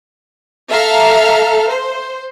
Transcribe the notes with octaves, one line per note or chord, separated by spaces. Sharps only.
A4 E5 F5 A#5 F6
C5